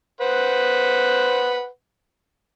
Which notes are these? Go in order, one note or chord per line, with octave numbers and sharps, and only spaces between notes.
B4 C5 F#5